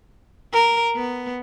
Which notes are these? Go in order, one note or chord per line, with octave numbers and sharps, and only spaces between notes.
A#4
B3